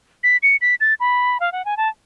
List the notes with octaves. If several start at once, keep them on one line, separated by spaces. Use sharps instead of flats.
B6
C#7
B6
A6
B5
F5
F#5
G#5
A5